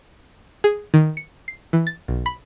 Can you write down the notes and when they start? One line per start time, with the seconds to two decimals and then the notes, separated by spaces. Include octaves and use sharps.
0.64 G#4
0.94 D#3
1.17 C#7
1.48 C7
1.73 E3
1.87 A6
2.08 B1
2.26 B5